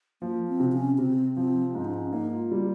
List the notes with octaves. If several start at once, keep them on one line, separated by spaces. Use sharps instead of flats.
F3 A#3
C4
C3
C#4
C3 C4
F3 C4
G#2 C4
D#4
C#4
A#3 D#4
F4
G3